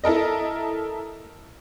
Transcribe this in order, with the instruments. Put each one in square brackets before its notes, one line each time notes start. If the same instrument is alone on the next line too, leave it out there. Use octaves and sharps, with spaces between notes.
[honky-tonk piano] E4 A4 A#4 D#5